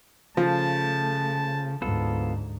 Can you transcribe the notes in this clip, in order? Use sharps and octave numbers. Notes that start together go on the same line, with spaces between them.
C#3 F3 A3 A5
D2 G#2 B3 F4 A4